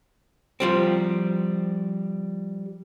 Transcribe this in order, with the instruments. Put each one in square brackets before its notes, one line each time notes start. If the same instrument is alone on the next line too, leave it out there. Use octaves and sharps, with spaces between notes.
[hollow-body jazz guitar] F3 G3 C4